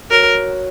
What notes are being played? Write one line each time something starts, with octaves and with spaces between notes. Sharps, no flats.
F#3 A#4